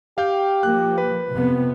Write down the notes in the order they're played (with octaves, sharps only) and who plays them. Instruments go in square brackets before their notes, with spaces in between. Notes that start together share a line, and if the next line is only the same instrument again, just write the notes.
[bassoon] G4 [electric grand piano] F5 G5 G6
[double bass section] F3 A#3 [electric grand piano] F#6
[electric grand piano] B4
[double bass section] F2 C3 B3